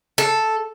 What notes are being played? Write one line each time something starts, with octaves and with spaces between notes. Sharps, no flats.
A4